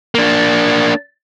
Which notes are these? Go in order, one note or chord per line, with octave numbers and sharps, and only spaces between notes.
A#3 D4